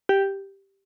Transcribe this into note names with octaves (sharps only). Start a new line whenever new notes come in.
G4